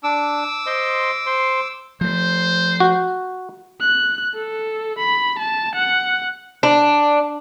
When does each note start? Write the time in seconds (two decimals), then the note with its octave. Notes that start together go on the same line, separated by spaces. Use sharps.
0.03 D4 D6 E6
0.67 C5 D#5 C6
1.26 C5 C6
2.01 F3 A3 C5
2.80 F#4
3.80 F#6
4.34 A4
4.98 B5
5.39 A5
5.75 F#5
6.63 D4